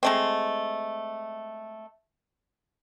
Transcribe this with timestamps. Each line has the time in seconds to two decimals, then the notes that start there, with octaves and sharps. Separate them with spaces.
0.03 G#3 A3 C4